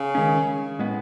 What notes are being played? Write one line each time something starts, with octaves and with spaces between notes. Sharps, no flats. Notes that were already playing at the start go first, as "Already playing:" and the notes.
Already playing: C#3
D#3 G#3 C#4
A2 G#3 B3